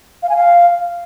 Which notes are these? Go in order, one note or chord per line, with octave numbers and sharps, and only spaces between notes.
F5
G#5
F5